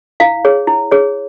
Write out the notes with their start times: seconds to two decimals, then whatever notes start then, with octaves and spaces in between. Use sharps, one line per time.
0.20 E4 F5
0.45 G#4 C#5
0.67 E4
0.91 G#4 C#5